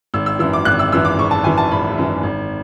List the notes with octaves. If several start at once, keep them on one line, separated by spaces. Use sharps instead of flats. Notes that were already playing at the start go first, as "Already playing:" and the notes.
G#1 E6
E6
F#2 E3 E6
D6
G#1 F#6
E6
F#2 E3 E6
D6
G#1 C#6
A5
F#2 E3 G#5
A5
G#1 B5
F#2 E3
G#1